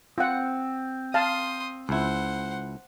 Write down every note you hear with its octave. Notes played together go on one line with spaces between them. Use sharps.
C4 F4 F#5
F5 A5 C6 D#6
C#2 E4 C5 F#5